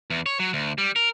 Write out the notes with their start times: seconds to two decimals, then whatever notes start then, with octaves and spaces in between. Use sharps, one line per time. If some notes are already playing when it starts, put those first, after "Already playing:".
0.10 E2
0.26 C#5
0.40 F#3
0.53 D2
0.78 G3
0.96 A#4